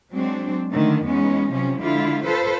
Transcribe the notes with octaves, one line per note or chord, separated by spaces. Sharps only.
F#3 G#3 C4 D4
D3 D#3 A3
E2 G#3 B3 C#4 D#4
C3 F3 F#3 C#4
D3 G#3 E4 F4
F4 A4 B4 C5